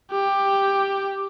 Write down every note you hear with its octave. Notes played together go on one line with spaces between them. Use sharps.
G4